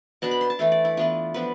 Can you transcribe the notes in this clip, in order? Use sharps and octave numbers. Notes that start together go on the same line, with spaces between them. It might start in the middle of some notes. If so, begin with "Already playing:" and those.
B2 B3 D4 A5
B5
C6
A5
E3 A3 E4 F5
D5
E4
E3 B3 D4 F4
F3 B3 D4 B4